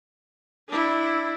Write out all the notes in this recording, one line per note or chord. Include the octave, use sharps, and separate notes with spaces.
D4 E4